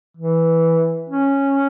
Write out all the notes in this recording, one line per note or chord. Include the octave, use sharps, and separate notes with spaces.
E3
C#4